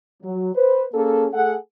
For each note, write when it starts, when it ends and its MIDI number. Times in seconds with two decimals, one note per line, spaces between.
0.23 0.51 54
0.55 0.85 71
0.55 0.85 72
0.94 1.28 58
0.94 1.28 61
0.94 1.28 68
0.94 1.28 69
1.34 1.56 57
1.34 1.56 68
1.34 1.56 69
1.34 1.56 78